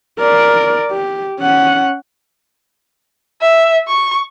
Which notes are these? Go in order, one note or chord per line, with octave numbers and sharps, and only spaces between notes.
A#4 D5
G4
C#4 F#5
E5
C#6